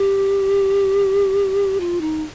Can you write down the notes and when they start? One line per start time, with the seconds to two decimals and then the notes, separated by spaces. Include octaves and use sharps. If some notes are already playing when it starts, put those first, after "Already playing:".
Already playing: G4
1.80 F4
2.01 D#4